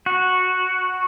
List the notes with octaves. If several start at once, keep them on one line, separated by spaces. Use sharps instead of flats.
F#4